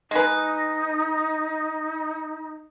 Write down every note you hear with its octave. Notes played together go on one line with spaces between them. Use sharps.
G#3 D#4 B4